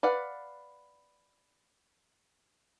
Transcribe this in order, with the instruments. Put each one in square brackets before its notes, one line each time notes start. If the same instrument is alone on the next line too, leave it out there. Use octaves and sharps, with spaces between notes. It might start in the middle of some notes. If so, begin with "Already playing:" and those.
[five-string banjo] B4 D5 F5 F#5